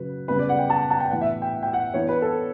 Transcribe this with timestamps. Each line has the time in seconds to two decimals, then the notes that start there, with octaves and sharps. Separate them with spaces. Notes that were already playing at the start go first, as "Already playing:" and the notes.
Already playing: C#3 F#3 B4
0.28 C#3 G3 B3 B4
0.39 D5
0.49 F#5
0.59 G5
0.70 A5
0.90 A5
1.00 G5
1.11 A2 E3 B3 D4 F#5
1.21 E5
1.42 G5
1.63 G5
1.73 F#5
1.94 E3 B3 D4 C#5
2.09 B4
2.22 A4